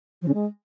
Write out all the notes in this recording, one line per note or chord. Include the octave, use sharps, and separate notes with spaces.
F3
C#3
G#3